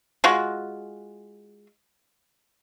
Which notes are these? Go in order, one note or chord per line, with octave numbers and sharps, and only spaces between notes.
G#3 F4 F#4